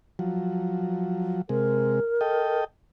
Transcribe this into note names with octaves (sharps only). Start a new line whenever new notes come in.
F3 F#3
C3 G#3 A#4
A4 D#5 G5